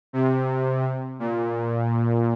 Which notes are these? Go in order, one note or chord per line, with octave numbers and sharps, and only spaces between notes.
C3
A#2